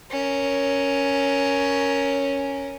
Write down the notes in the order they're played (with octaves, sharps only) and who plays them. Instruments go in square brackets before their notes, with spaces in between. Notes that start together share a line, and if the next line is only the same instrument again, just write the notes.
[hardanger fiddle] C#4 A#4